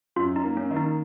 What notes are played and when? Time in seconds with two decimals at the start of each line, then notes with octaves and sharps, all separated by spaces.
0.16 F#2 F4
0.36 D#4
0.43 A#3
0.57 C#4
0.71 D#3
0.77 D#4